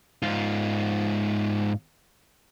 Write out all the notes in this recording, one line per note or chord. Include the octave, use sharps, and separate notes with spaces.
G#2 F4